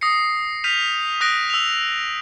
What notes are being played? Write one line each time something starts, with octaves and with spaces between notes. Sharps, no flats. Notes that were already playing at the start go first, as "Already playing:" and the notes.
D#6 A#6 C7 C#7
F6 G6 B6 D#7 F7
D#6 F#6 A#6 D7
E6 F7